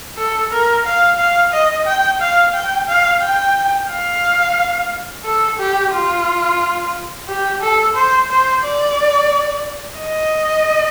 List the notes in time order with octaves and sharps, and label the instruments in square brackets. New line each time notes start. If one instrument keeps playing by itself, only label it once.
[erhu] A4
A#4
F5
F5
D#5
G5
F5
G5
F5
G5
F5
A4
G4
F4
G4
A4
C5
C5
D5
D#5